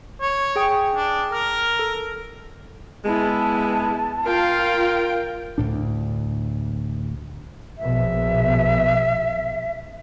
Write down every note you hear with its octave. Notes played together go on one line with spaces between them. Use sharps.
C#5
G#4 G5 D#6
D4
A#4 F6
A4
G#3 B3 E4 A5
F4 A#4 F5 G5
D2 A2 D4
A#1 B2 E5